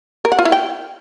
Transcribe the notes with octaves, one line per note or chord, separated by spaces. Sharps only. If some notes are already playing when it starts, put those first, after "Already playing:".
A#4
F#5
F4
E4
G5